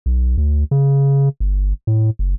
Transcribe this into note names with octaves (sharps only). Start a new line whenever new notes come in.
B1
D2
C#3
G1
A2
F#1